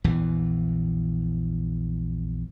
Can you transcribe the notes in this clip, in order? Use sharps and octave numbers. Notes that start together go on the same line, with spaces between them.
A#1 E2 E3